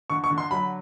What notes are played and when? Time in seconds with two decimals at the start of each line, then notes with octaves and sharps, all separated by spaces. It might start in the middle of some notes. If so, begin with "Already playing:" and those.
0.10 D3 C#6
0.24 C#6
0.31 D3
0.38 C6
0.51 F#3 B5